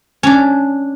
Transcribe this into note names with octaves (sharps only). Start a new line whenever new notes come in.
C#4 D4